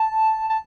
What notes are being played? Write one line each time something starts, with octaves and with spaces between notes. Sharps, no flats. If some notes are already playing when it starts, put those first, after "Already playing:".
Already playing: A5
A5